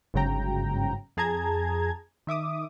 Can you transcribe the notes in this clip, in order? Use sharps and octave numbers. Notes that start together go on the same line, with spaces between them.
G1 G#2 C#3 F#3 G5 A#5
F2 G#4 A5 A#5 G#6
D#3 E5 D6 D#6